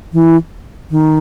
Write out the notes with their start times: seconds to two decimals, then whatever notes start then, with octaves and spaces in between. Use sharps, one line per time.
0.13 E3
0.91 D#3